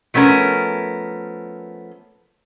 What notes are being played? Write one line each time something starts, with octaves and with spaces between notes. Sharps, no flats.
F3 A3 B3 C#4 A#4